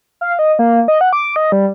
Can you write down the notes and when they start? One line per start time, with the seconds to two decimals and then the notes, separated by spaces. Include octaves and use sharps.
0.21 F5
0.39 D#5
0.59 A#3
0.88 D#5
1.01 F#5
1.13 D6
1.36 D#5
1.52 G3